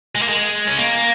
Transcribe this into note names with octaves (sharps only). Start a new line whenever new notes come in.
G#3
A#3
G#3
C#4
A#3